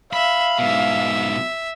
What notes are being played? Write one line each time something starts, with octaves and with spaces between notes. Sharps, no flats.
E5 F5 B5
G#2 B2 E5